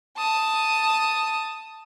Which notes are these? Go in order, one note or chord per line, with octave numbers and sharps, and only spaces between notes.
A5 D#6